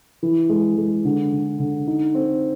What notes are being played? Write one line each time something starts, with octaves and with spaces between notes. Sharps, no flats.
E3
G#3
G#3
D3
D3
D3
D#4
C4